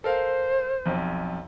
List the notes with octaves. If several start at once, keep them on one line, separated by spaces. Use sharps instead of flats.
A4 A#4 C5 F5
B1 F2